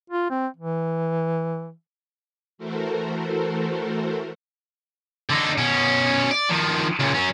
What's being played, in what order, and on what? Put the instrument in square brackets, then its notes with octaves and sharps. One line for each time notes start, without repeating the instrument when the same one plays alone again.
[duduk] F4
C4
E3
[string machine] E3 A3 F#4 A4 A#4 C5
[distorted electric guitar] D3 D#4
B2 C#4
D5
D#3 F3
C#2 A#2
F#3 C#4